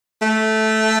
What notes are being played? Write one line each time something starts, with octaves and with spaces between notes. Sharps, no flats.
A3